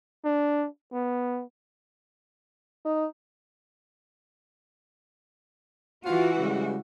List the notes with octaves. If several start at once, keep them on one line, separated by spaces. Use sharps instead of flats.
D4
B3
D#4
E3 F4 F#4
C#3 G3 G#3